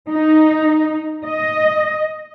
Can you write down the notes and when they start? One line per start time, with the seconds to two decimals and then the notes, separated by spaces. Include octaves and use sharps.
0.10 D#4
1.26 D#5